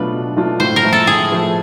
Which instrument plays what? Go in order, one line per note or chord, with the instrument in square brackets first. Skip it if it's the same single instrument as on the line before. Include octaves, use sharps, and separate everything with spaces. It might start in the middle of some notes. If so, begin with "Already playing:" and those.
Already playing: [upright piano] B2 F#3 A3 D4 F4 [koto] B4
[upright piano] B2
F#3 A3 D4 F4
[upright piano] A2 [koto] C5
[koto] A#4
[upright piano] F3 A3
[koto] A4
[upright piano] A2 [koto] G#4
[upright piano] F3 A3